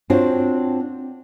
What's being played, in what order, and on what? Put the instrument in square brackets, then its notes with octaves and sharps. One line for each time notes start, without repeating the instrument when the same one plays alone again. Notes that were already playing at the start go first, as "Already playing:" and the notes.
[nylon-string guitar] C4 D4 F4 F#4 C5 C#5